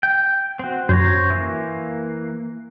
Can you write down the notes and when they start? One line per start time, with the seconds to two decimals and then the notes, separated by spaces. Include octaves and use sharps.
0.03 G5
0.59 C4 F#4
0.89 F#2 C5 C#5 A#5
1.30 E3 A#3